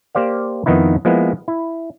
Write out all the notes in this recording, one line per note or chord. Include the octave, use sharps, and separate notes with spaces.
A#3 G4 C5 D5 F5
F2 D#3 B3 D#4 E4
F3 G#3 A#3 B3 E4
E4